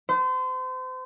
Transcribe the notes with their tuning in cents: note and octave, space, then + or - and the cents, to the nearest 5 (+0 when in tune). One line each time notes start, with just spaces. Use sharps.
C5 -35